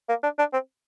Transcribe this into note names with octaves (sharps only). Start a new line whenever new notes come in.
A#3
D4
D4
C4